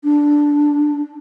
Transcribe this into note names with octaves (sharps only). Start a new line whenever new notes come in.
D4